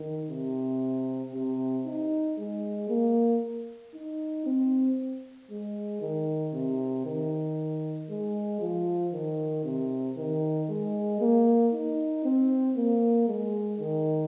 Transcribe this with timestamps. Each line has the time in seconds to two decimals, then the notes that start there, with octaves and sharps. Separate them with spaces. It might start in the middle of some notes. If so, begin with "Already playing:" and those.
Already playing: D#3
0.30 C3
1.34 C3
1.86 D#4
2.38 G#3
2.89 A#3
3.94 D#4
4.46 C4
5.50 G#3
6.01 D#3
6.54 C3
7.05 D#3
8.10 G#3
8.61 F3
9.13 D#3
9.65 C3
10.17 D#3
10.69 G#3
11.21 A#3
11.74 D#4
12.24 C4
12.77 A#3
13.28 G#3
13.80 D#3